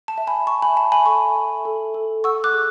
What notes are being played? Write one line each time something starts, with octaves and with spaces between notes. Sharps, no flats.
A5
E5
G#5 B5
E5 A5 C#6
G#5 B5
E5 A5
G#5 B5
A4 A5 C#6
E5
A4
A4
F#5 C#6 E6
D6 F#6
G#4